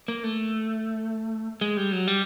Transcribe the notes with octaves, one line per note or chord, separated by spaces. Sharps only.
A#3
A3
G#3
G3
F#3
G3